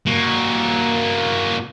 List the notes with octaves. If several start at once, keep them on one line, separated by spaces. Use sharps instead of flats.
A#3 F#4